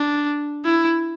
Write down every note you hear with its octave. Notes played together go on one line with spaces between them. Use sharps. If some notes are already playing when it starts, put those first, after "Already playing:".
Already playing: D4
E4